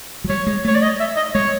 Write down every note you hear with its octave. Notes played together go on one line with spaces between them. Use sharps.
F#3
G3 C#5
G#3
A3 C#5
D5
D#5
E5
D#5
G#3 C#5